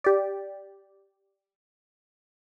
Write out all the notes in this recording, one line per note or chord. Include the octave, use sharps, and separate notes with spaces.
G4 D5